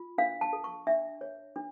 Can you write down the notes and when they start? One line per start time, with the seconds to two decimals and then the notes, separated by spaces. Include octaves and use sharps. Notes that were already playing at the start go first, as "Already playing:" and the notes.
Already playing: F4
0.18 D4 F5
0.41 A5
0.53 A4
0.64 C#6
0.87 D4 E5
1.21 C#5
1.56 D4